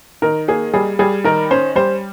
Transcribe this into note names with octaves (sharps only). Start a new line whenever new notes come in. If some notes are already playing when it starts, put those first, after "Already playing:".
D#3 A#4
A#3 G#4
G3 G#4
G3 G#4
D#3 A#4
C#4 C5
G3 C5